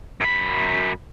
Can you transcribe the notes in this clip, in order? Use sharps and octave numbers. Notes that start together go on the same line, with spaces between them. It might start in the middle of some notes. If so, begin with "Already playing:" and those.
F#2 B5